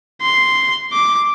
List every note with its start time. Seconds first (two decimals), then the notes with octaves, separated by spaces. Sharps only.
0.21 C6
0.93 D6